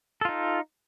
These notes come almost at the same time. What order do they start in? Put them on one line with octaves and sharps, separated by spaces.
A4 F4 D#4